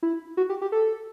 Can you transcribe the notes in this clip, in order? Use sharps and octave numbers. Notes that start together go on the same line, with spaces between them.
E4
F#4
G4
G4
A4